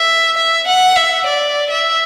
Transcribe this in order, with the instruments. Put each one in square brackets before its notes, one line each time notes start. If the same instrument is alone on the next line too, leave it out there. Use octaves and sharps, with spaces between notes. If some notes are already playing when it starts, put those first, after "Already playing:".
Already playing: [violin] E5
E5
F#5
E5
D5
E5